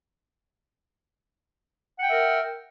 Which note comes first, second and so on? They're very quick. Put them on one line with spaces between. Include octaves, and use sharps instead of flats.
F#5 G5 E5 A#4